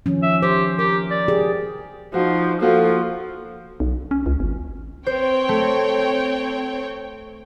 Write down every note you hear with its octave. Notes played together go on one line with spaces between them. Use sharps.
D#3 F3 C#4
E5
G4 C5
G4 A#4
D5
G4 G#4
F3 D#4 F#4
F3 A#3 F4 F#4 A4
B1
C#4
C#2
G#1
C4 C5 C#5 G5
A3